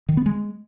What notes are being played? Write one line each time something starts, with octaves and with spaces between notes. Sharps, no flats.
D#3
B3
G#3